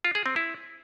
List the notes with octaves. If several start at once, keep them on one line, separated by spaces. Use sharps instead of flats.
F4
G#4
C4
E4